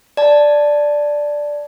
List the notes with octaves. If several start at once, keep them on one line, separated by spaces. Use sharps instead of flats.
D5 A5